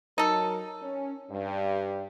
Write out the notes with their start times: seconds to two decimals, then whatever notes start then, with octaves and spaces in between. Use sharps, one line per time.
0.18 F#3 D#4 A4 A#4
0.82 C#4
1.31 G2